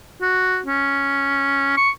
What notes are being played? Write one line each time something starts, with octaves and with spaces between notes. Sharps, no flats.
F#4
C#4
C#6